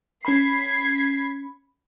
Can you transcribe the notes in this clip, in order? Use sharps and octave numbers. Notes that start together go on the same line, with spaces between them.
C#4 B5 G#6 B6 C7